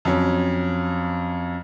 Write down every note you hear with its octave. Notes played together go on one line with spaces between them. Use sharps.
F2 F#3 C#4